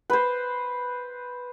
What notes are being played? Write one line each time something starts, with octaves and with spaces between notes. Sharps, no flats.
B4 C5